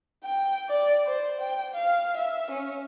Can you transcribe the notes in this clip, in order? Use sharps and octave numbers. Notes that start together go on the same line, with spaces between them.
G5
D5
C5
G5
F5
E5
C#4